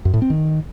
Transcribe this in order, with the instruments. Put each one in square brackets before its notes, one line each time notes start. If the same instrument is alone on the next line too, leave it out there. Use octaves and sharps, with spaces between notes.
[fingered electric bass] F#2
A2
C4
D#3